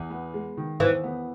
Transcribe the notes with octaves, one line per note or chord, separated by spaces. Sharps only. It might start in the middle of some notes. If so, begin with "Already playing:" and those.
Already playing: E2
B3
G#3
D#3
E2 E3
B3